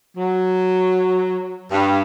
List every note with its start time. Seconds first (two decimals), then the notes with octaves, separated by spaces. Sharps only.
0.17 F#3
1.71 G2